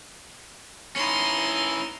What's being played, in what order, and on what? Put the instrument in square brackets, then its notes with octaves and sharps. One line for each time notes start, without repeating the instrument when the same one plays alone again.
[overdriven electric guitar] C#4 E4 [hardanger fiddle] D#4 C6